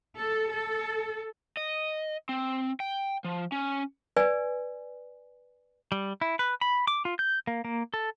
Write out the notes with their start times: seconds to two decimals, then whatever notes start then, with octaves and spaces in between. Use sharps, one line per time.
0.17 A4
0.49 A4
1.57 D#5
2.29 C4
2.80 G5
3.24 F3
3.52 C#4
4.17 B4 D5 G#5
5.92 G3
6.21 E4
6.39 B4
6.61 B5
6.87 D6
7.05 F4
7.19 G6
7.47 A#3
7.65 A#3
7.94 A4